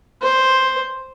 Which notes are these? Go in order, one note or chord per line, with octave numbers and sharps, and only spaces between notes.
C5